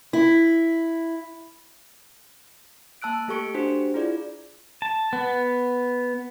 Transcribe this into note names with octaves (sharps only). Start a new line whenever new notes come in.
E4
A#3 A5 E6 F#6 D7
A3 G4 A4 C#6 C#7 D7
D4 F#4 G4 C5
E4 F4 G#4 D5
A5
B3